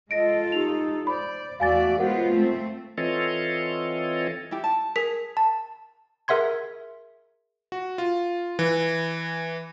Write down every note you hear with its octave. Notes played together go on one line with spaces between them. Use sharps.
G#3 F4 A4 D#5 A#6 D7
D#4 G4 F7
C5 D5 B5
E2 A3 F#4 D5 F5 G#5 A6
G#3 B3 F4 A#4 C5 F#5
A3 C4
E3 C4 F4 A4 C#5 D#5
E4 G4
A5
G#4 A#4 B6
A5
G#4 A#4 E5 F#5 C6 G#6
F#4
F4
E3